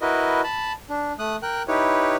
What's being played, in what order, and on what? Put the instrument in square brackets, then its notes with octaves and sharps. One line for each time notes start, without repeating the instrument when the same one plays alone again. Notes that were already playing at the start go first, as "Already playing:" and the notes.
[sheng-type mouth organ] E4 F#4 A#4 B4 D#5
A5 B5
D4
A3 D#6 F#6
A#4 G5 F#6
D#4 E4 G4 B4 C#5